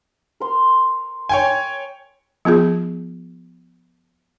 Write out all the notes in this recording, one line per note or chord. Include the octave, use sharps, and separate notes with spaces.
A#4 C6
C#5 G5 G#5
F3 B3 F4 G#4